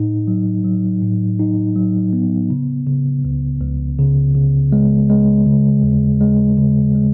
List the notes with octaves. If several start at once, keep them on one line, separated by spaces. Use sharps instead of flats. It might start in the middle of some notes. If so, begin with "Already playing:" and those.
Already playing: A2 D#4
F#3
F#3
A2
D#4
F#3
B3
C#3
C#3
C#2
C#2
C#3
C#3
G#3
G#3
C#3
D#2
G#3
C#3
G#3